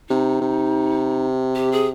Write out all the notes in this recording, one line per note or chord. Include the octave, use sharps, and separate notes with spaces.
C3 D#4
C3
G4
G#4